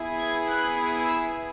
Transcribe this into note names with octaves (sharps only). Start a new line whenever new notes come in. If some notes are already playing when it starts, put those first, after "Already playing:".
Already playing: B3 E4 G#4
G#6
F#6
E6